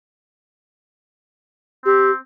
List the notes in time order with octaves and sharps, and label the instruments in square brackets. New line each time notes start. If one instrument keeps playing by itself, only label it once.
[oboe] C4 [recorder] G4